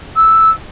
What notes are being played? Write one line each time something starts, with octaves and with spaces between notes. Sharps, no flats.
E6